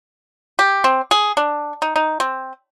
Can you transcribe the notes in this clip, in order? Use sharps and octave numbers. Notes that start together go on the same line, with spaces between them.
G4
C4
G#4
D4
D#4
D#4
C4